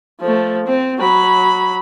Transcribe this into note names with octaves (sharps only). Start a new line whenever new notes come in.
F3 A3
C4
F#3 B5